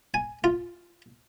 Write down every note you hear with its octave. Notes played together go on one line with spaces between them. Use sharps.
G#5
F4